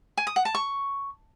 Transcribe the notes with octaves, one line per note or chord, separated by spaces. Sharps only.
G#5
D#6
F#5
A5
C#6